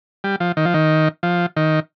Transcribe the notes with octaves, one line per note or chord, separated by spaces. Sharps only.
G3
F3
D#3
F3
D#3
F3
D#3